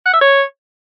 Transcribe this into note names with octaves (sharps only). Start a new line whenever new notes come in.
F#5
E5
C#5